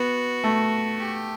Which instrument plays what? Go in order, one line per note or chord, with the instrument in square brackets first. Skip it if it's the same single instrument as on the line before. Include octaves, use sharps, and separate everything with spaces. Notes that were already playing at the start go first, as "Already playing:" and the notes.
Already playing: [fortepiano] B3 [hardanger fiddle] F#4
[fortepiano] A3
[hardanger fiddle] G4